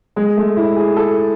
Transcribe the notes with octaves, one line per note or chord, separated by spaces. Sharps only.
G#3
A3
E4
G#4
A4